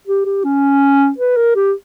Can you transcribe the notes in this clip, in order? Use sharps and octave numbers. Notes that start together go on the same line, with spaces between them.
G4
G4
C#4
B4
A#4
G4